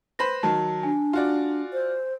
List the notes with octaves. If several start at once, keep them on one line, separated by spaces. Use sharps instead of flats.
B4 C5 B5 A#6
D#3 F#3 A5
D4 G#5
F4 F#4 D5
C5